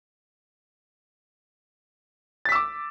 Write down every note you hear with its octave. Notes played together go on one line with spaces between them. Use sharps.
D6 E6 A6 B6